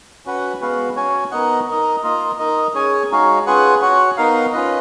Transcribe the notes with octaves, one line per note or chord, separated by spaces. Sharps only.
C#4 F#4 B4 F#5
G#3 B3 F#4 B4 F5
C#4 F#4 C#5 G#5
B3 D#4 A#4 D#5 F#5
D#4 A#4 D#5
A#3 F4 A#4 D#5
D#4 A#4 D#5
C#4 G#4 C#5 G#5
G#3 D#4 F#4 C#5 F5
C#4 F4 G#4 B4 F#5
F#4 C#5 F#5
B3 D#4 A#4 F5
C#4 F4 B4 D#5